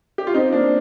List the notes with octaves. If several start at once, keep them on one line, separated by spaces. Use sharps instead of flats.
G4
F4
C4 D#4
A#3 D4